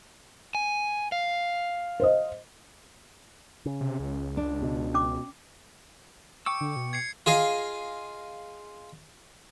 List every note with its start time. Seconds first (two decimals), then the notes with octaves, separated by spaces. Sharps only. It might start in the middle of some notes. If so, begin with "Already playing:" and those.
0.55 G#5
1.12 F5
2.00 C5 D#5
3.66 C#3
3.81 C3
4.00 C#2
4.37 D4
4.62 B2
4.94 C#4 D6
6.46 G5 C#6 D6 E6 C#7
6.61 D3
6.76 B2
6.93 G#6 C7 C#7
7.26 F4 G#4 D#5 F5